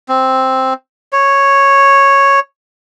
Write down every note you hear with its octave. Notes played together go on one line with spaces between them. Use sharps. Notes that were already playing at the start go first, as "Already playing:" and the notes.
C4
C#5